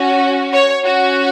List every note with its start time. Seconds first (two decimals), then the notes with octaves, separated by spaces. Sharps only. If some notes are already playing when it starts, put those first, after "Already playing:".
Already playing: C#4 F#4
0.52 C#5
0.84 C#4 F#4